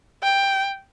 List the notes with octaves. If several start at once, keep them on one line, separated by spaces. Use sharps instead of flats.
G5